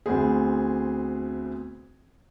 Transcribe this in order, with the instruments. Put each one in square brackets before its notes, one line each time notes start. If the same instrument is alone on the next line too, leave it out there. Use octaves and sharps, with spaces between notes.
[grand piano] D2 B3 C4 G#4